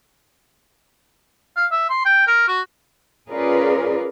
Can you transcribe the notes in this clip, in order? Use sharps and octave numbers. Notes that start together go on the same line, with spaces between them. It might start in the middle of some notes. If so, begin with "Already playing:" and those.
F5
E5
C6
G5
A#4
F#4
C#4 F4 G#4 A#4 B4 D5